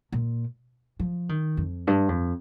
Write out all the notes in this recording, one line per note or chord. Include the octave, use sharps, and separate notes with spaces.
A#2
F3
D#3
F2
G2
F2